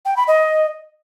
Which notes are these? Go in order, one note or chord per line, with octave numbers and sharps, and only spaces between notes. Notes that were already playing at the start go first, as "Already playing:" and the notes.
G5
B5
D#5